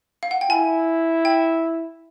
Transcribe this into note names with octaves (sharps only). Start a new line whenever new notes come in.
F5
F#5
G5
E4 G#5
G5